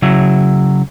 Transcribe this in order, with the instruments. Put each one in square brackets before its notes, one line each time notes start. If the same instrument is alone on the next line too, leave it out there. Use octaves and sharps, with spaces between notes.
[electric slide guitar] C#3 F#3 E4